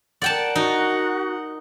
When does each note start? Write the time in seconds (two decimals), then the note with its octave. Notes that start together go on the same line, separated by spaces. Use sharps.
0.22 A#4 D5 F#5 G5 A5
0.56 D#4 F#4